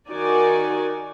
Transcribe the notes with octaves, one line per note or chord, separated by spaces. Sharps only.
D#3 D#4 F#4 A#4 D5 G#5